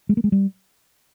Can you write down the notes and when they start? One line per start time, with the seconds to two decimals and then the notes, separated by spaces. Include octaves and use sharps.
0.09 G#3
0.17 A#3
0.24 G#3
0.32 G3